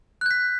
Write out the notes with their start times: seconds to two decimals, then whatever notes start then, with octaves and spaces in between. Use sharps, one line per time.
0.21 F#6
0.26 G6
0.31 B6